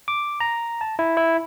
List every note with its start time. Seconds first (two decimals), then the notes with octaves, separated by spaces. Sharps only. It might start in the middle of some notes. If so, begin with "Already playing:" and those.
0.08 D6
0.40 A#5
0.81 A5
0.99 E4
1.17 E4